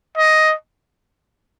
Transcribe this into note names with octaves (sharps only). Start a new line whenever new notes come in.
D#5